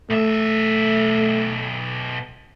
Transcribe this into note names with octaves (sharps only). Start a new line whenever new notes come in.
B1 A3 E5